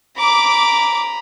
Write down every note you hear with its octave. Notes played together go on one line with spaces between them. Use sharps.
A#5 B5 D6